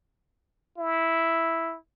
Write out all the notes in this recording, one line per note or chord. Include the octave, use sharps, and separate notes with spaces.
E4